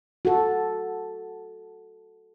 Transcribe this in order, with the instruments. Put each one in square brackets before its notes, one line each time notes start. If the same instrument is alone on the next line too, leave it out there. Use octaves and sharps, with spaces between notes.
[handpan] F#4 A4